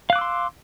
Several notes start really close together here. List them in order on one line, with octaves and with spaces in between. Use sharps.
F5 F#6 D6 E6 C6